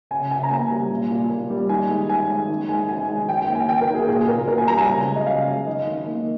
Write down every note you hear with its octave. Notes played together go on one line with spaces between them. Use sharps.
C#3 G#5
C#3 G#5
A#5
A#3 G#5
G3
A#2
A#2
A#3
G3
D#3 G#5
G#3
D#3 G#5
G#3
D#3
G#3 G#5
D#3 G#5
G#3 G#5
D#3 G5
G5
A#3
G#5
D#3 G5
A#4
A#3
G#4
A#2 G#4
A#2 A#4
A#3 A#4
G#5
G3 A#5
G#5
C#3
G#3
D#5
C#3 F5
G#3
D#3 D#5
D#3
A#3